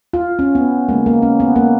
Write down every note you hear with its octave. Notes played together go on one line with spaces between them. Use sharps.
F4
C#4
B3
C#3 G#3 A#3
A#3
C#4
B3
A#3